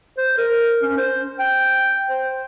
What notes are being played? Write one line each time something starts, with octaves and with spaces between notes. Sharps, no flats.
C5
A#4
C#4
C5
G5
C5